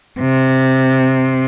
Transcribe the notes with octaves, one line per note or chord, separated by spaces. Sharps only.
C3